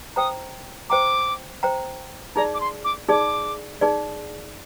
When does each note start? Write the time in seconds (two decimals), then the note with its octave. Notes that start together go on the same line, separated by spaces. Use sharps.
0.16 C5 G5 A#5 D#6
0.90 C5 G5 A#5 D6
1.63 C5 G5 A#5
2.35 D#4 G#4 D5 A#5
2.54 D6
2.60 C6
2.84 D6
3.09 D#4 G#4 D5 D6
3.81 D#4 G#4 D5